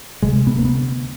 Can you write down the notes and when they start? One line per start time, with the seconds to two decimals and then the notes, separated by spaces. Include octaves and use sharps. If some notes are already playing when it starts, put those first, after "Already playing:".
0.22 D2 C3 G#3
0.47 B3
0.56 D2 C3 A#3
0.65 B3